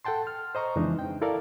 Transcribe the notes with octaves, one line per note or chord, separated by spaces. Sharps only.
A4 F#5 G5 A5 C6
F6
C5 D#5 A#5 C#6
F2 C#3 E3 G#3 D4 D#4
G5
E4 A4 A#4 D5 F5